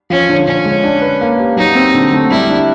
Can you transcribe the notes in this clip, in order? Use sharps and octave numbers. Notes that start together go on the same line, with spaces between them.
F3 C#4
D3
D3 C#4
G#3
D4
B4
A#3
G4
F#3 D#4
C4
D3
A3
G3 E4
D4